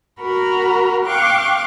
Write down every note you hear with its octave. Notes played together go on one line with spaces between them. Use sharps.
F#4 A#4 A#5 B5
F5 G5 C#6 D6 F#6